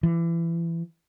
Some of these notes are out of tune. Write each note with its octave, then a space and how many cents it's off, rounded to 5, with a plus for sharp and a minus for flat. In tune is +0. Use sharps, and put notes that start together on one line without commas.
E3 +30